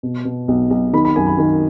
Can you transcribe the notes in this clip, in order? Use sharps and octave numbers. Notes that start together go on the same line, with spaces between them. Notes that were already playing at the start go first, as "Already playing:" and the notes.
B2
B2
B1
B1
D#3 B5
B5
F#2 G#5
B5
D#3